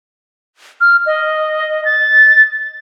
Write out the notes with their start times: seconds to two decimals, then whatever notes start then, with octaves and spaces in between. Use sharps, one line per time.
0.81 F6
1.06 D#5
1.85 A6